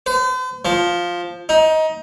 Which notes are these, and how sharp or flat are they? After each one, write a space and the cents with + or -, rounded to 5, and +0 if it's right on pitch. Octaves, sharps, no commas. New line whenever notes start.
C5 -45
F3 +5
D#4 +20